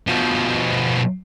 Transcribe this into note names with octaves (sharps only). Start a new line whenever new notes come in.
B2 F3